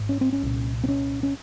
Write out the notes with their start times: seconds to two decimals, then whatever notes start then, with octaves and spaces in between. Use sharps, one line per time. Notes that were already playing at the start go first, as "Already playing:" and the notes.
Already playing: G#1 G#2
0.09 C#4
0.21 C4
0.33 C#4
0.42 C2 A#2
0.84 C4
0.88 C#4
1.23 C#4